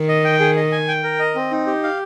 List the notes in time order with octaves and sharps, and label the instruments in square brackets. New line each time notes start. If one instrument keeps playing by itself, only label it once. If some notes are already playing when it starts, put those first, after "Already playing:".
Already playing: [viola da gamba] D#3
[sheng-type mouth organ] D#5
G5
G#4
D#5
G#5
G5
A#4
D#5
C4
D#4
G4
F5